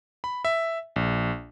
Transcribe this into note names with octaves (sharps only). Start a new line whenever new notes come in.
B5
E5
A#1